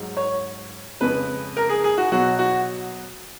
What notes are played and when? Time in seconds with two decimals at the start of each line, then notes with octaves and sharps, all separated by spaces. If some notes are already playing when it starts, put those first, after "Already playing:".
Already playing: G#2 F#3
0.17 C#5
1.00 F2 C#3 G#3 B4
1.57 A#4
1.69 G#4
1.84 G#4
1.98 F#4
2.12 B2 F#3 F#4
2.39 F#4